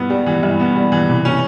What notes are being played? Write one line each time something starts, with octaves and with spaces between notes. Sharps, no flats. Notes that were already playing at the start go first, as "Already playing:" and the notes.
Already playing: G2 B3
G3
E3
G2
B3
G3
E3
C3
C#4